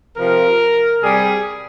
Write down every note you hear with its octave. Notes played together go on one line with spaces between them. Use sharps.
C3 F3 A#4
C3 G3 G#4